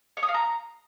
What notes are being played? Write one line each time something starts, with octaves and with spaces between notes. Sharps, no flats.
C#5
D#6
F5
A#5